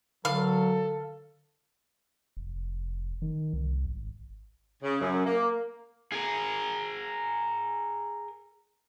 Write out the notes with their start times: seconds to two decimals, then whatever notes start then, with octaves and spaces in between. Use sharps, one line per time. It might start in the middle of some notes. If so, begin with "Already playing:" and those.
0.25 D3 F#3 A4 F5
2.37 F1
3.22 D#3
3.53 C2
3.86 G#1
4.83 C#3
5.01 F#2
5.25 A#3
6.12 G#4 A#4